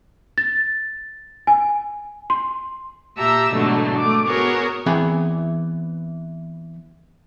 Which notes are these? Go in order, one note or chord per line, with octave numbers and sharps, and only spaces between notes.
A6
G#5
C6
A#2 G4 E5 A5 A#5 E6
G#2 B2 D3 E3 F#3 A3
A3 D6
B3 F#4 G#4 A#4 C#5
E3 B3 C4 G#4 G#5 B5